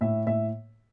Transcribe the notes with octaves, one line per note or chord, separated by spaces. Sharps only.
A2 E5
A2 E5